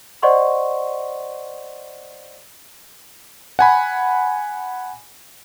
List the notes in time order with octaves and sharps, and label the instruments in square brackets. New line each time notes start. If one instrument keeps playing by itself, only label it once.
[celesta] C5 D5 D#5 F#5 C6 C#6
[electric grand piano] F#5 G#5 B5